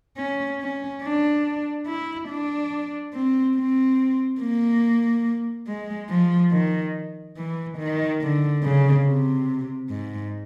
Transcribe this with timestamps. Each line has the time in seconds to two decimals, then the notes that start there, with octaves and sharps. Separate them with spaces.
0.17 C#4
0.61 C#4
1.03 D4
1.87 E4
2.29 D4
3.13 C4
3.56 C4
4.41 A#3
5.67 G#3
6.09 F3
6.52 D#3
7.37 E3
7.78 D#3
8.21 D3
8.63 C#3
9.05 C3
9.90 G#2